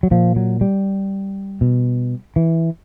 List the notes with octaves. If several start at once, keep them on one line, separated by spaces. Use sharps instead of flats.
F#3
A#2 F3
F#3
G3
B2
E3